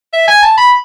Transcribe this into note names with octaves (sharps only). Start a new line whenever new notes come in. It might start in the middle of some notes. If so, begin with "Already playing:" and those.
E5
G#5
A5
B5